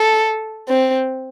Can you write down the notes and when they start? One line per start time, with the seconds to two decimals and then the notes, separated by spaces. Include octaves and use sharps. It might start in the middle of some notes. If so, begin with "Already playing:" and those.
Already playing: A4
0.69 C4